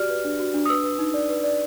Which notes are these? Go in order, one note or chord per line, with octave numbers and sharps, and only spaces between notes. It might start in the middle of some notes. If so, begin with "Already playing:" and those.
Already playing: F#4 G4 D5 F6
B4
D4
F#4
D4
D#6
B4 E6
B4
D#4
D5
B4
D5